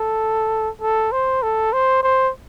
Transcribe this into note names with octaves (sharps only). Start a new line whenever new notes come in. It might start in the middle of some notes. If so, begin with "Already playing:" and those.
Already playing: A4
A4
C5
A4
C5
C5